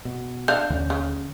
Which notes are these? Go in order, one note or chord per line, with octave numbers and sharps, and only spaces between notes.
B2
D4 E5 F5 G6
D#2 D3 C#4
C#3